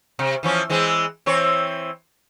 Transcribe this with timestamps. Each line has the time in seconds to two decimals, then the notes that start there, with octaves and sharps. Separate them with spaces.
0.19 C3
0.43 E3 F3 C#4
0.70 E3 G#3 C4
1.26 E3 C4 C#5